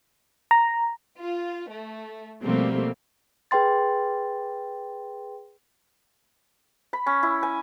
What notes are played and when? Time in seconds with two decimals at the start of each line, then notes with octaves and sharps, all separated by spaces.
0.51 A#5
1.19 F4
1.70 A3
2.43 B2 F3 G3 A3 A#3 C4
3.51 G#4 B4 G5 C6 A6
6.93 B5
7.06 C#4
7.23 E4
7.43 G#5